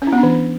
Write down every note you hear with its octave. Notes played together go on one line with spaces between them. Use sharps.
C#4
E4
B3
D4
E3